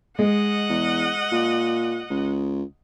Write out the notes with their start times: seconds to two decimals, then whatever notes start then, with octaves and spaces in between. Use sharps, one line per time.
0.19 G#3 D#5 F#5
0.69 E2
1.31 A#2
2.10 C#2